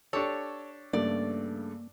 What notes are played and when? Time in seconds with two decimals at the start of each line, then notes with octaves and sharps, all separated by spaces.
0.13 D4 G4 A4 C#5
0.93 G2 C#3 A3 A#3 D5